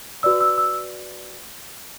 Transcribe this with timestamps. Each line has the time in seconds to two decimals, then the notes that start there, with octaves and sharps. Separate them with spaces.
0.23 F#4 B4 D5 E6
0.41 E6
0.58 E6